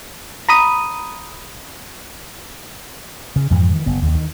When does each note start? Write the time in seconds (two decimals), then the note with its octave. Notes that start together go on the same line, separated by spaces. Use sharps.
0.49 A#5 B5 D#6 D#7
3.36 C#3
3.50 F2 G#2 E3 F3
3.72 D#3 E3
3.86 F#1 B3
4.02 D#2 C#3
4.15 D#3